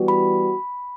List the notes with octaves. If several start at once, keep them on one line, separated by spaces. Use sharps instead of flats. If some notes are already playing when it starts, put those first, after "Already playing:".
Already playing: E3 G3 B3 F#4
B5